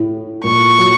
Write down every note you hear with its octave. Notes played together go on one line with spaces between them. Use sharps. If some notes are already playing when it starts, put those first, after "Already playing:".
Already playing: A2
A#2 C#6
F#3